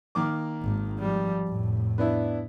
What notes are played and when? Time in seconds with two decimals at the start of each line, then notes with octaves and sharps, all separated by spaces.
0.15 D#3 A#3 D6
0.62 G#1
0.99 F3 G3
1.49 F1 A2
1.98 B3 D4 E4